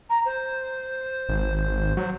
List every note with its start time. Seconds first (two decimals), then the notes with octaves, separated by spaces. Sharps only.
0.09 A#5
0.25 C5
1.29 G#1
1.97 F#3